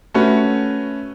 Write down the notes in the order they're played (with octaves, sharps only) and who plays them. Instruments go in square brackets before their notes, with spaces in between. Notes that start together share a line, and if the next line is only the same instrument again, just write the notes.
[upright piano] A3 C#4 F#4 B4